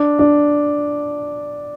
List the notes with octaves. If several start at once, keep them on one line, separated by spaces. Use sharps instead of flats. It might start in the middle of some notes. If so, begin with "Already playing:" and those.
Already playing: D4
D4